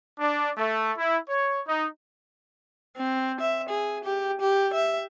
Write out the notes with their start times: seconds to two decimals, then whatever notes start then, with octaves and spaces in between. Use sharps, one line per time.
0.19 D4
0.57 A3
0.98 E4
1.28 C#5
1.66 D#4
2.97 C4
3.41 E5
3.69 G#4
4.04 G4
4.41 G4
4.74 E5